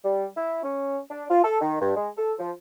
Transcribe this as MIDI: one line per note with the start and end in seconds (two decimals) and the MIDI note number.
0.04 0.26 55
0.37 0.61 64
0.63 0.99 61
1.11 1.25 62
1.30 1.42 65
1.44 1.59 69
1.61 1.79 51
1.81 1.92 43
1.96 2.09 56
2.18 2.33 69
2.39 2.52 53